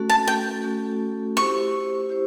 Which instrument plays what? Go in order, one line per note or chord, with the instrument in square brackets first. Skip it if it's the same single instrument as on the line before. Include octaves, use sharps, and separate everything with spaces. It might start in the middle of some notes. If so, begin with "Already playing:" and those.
Already playing: [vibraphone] A3 C#4 F#4 A4
[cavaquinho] A5
G5
[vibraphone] A3 C#4 F#4 A4
[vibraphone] E4 G4 C5 [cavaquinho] C#6
[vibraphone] E4 G4 C5